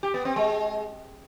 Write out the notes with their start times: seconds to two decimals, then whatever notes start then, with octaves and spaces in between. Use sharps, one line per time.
0.03 G4
0.14 B3
0.25 C4
0.36 G#3